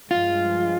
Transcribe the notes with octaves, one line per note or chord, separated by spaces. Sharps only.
G2 F3 G#3 F4